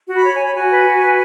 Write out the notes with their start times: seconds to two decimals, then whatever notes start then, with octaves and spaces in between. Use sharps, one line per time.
0.08 F#4
0.14 B5
0.24 C#5
0.35 C#5 G#5
0.45 B5
0.55 F#4 G#5
0.71 B4
0.86 F#4
1.02 B4